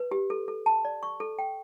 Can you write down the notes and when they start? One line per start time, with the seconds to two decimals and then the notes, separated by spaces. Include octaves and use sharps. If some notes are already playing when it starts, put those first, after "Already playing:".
Already playing: B4
0.11 G4
0.30 A4
0.48 A4
0.66 A5
0.85 D5
1.03 C#6
1.20 A4
1.39 G5